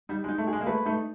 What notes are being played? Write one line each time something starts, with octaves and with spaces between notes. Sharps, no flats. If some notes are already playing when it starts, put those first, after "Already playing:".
G3 D#4
G#3
D#4
A3
G#4
G#3
A#3
A3 B4
A3 D#4